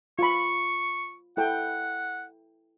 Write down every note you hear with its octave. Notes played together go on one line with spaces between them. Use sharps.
F4 B5 C#6
E4 A4 F#5 G5